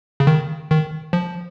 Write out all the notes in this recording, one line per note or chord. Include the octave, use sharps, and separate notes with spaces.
C#3
D#3
D#3
F3